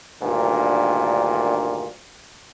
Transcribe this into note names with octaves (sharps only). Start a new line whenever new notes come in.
D2 G2 A#2 D#3